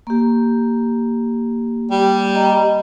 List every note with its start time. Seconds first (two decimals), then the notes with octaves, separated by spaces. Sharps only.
0.07 A#3 G4
1.91 G3
2.35 D#5 A#5